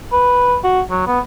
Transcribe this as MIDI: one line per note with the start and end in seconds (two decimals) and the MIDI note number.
0.12 0.56 71
0.64 0.81 66
0.91 1.02 54
1.07 1.20 59